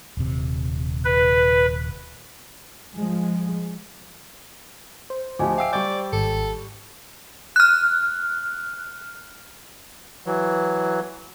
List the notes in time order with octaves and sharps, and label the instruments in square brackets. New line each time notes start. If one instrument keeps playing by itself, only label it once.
[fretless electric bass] D#1 C3
[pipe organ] B4
[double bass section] F3 G#3
[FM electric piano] C5
[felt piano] D2 F3 G4 [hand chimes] D#5 G#5 D6
[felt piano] E5 D7 [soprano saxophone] F5 [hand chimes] G5 E6
[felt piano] G3 C#6 G6 [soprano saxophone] D5
[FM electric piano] G#1 [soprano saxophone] A4
[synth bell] F6 F#6
[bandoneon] E3 F#3